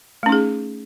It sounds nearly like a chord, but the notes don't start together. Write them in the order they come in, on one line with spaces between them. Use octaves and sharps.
A3 C#4 D#4 G#4